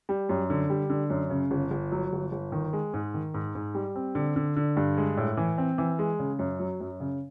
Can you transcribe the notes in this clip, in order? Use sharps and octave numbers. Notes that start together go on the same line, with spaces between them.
G3
F#2
D3
G3
D3
F#2
C#3
G1
G1
F#3
G1
G1
D#3
G#3
G#2
D#3
G#2
G#2
G3
C4
D3
D3
D3
G2
G#3
A2
E3
C4
E3
G#3
C#3
F#2
F#3
F#2
C#3